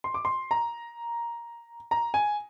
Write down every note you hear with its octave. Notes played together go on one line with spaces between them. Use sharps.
C6
D6
C6
A#5
A#5
G#5